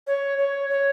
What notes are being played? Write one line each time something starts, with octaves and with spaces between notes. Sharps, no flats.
C#5
C#5
C#5